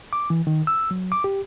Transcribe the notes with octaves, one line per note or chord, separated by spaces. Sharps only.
D6
E3
D#3
E6
F#3
D6
G4